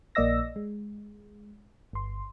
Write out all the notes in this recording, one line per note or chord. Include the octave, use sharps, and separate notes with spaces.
A#1 A#3 D5 D#5 E6 A#6
G#3
G1 C6